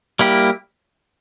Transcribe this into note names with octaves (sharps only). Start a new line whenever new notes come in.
G3 A#3 E4 G4